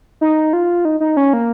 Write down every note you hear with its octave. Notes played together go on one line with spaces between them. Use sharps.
D#4
F4
D#4
D#4
C#4
A#3